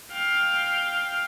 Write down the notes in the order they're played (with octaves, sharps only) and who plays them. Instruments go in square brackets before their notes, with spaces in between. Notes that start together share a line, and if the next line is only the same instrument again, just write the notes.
[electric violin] F5 G5